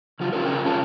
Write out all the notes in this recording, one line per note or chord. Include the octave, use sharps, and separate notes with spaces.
C#3 F#3 F4
C#4 F4 A4 A#4
E2 C#3 C#4 G#4 A#4 G5
C3 F4 C#5 A5